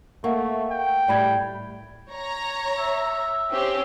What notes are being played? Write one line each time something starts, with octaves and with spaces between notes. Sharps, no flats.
A3 A#3 E5 F#5 C#6
G5
A2 G3 D5 B5 G#6
C#5 A#5
E5
C4 C#4 G4